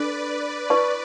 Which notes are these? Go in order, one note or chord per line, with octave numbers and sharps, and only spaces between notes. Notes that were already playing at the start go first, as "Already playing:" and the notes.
Already playing: D4 A4 B4 D5
E4 B4 D5 A5 C#6